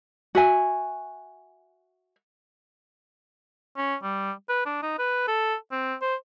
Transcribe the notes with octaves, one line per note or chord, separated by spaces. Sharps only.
F#4 E5 G#5
C#4
G3
B4
D4
D#4
B4
A4
C4
C5